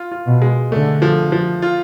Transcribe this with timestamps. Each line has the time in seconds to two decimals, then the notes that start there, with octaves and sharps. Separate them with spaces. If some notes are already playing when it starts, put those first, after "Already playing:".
Already playing: F4
0.12 F4
0.26 B2
0.42 G#3
0.72 D3 A3
1.02 F3
1.32 F3
1.62 F4